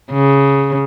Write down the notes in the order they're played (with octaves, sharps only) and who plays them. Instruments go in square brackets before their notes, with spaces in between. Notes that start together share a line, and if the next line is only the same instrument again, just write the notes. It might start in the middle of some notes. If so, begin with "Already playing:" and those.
[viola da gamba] C#3